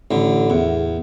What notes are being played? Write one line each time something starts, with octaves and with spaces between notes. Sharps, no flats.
A1 D3
E2